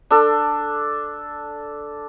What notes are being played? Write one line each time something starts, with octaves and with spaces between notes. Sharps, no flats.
D4 A4